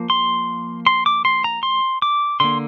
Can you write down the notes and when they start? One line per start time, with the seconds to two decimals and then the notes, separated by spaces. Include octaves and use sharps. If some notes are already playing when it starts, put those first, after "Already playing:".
Already playing: F3 A#3
0.10 C6
0.86 C6
1.06 D6
1.25 C6
1.44 A#5
1.63 C6
2.02 D6
2.40 D3 A#3 C6